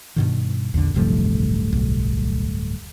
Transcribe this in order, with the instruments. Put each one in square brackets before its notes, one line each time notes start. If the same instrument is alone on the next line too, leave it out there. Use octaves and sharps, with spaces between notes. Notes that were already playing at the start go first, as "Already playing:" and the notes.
[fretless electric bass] G2 B2 D#3
[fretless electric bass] A#1 D3 [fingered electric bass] E2
[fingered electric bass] D1 G2 A3 [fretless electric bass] A1 C3 F3
[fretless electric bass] B1